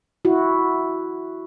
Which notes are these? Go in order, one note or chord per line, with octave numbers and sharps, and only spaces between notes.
E4 F#4